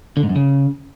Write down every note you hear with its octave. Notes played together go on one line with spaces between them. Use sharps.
D3
G#2
F#2
C#3